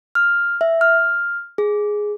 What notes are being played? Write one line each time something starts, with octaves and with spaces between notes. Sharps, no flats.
F6
E5
F6
G#4